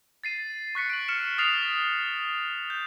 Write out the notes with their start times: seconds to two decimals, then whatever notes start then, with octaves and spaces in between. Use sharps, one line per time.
0.24 A6 C7 D#7
0.75 C#6 F#6 B6 C#7
0.90 D7 F#7
1.08 F6 C#7 E7
1.38 D#6 F6 A6 B6 C7 F7
2.70 G6